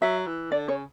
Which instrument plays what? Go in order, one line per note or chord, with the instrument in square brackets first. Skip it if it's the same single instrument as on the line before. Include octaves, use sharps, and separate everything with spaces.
[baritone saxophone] F#3 [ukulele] E5
[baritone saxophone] E3
[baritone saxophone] D3 [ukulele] D5
[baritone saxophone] C#3 [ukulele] C#5